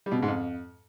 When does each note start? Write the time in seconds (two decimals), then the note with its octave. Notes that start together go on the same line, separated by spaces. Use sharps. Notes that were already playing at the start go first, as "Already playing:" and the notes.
0.06 G3
0.12 B2
0.17 C#3
0.23 G#2
0.28 F2